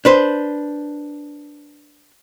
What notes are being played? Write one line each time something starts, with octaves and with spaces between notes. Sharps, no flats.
D4 B4 C5